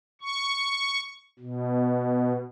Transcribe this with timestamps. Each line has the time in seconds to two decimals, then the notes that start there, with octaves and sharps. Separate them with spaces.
0.21 C#6
1.39 B2